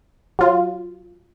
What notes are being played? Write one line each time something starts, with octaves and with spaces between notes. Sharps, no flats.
F#3 F4